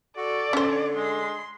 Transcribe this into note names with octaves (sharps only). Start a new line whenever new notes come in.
F#4 A4 D5
D3 C#4 C5
G#3 C6